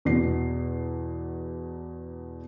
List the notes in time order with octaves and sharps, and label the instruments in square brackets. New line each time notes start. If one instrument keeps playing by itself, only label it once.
[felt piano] E2 B2 C7